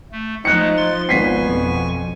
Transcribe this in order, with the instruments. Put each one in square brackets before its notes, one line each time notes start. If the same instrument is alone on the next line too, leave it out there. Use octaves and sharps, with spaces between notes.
[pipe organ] A3
[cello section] F3 [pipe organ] G#3 A3 [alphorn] D#4 [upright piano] F#6 C#7
[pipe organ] C6 A6
[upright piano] G#1 B6 C7 [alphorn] B3 [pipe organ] G#5 C#6
[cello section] F2 B2